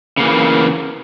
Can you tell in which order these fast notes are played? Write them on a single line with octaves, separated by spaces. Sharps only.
C#3 A#3 E3